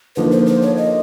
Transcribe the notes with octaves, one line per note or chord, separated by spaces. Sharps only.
D3 F3 A#3 D#4 B4
C5
C5
C#5
D#5